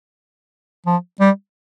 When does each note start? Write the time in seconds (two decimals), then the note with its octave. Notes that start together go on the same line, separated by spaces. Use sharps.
0.86 F3
1.20 G3